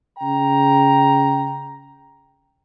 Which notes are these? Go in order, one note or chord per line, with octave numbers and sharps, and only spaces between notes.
C#3 G5 A#5